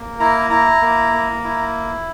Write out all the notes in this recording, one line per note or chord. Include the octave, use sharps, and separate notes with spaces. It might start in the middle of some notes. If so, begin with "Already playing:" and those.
Already playing: A#3
E4 A#5
E4 A#5
A#3
A#3
E4